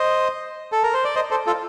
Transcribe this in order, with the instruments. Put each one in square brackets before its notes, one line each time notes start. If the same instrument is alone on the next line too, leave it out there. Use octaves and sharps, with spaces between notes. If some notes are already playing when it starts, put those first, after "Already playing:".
Already playing: [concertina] C5 D#5
A4
A#4
C5
D5
C5 D#5
A4 C5
F4 A4